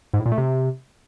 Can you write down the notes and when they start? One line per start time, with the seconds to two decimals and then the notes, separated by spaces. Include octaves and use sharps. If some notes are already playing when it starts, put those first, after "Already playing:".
0.14 G#2
0.20 A2
0.26 A#2
0.32 A3
0.38 C3